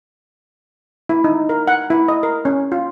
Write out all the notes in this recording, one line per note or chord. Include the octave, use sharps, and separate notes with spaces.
E4
D#4
A#4
F#5
E4
D#5
A#4
C#4
F4